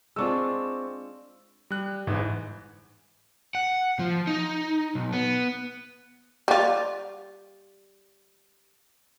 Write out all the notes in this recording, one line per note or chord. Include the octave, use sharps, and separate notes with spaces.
G#3 C4 D4 F4 C#6 E6
G3 F#6
G1 G#2 E3
F#5
F3
D#4
B1
B3
G3 F4